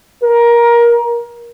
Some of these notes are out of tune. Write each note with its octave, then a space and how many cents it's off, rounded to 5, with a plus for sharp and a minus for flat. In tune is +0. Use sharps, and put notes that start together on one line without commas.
A#4 +20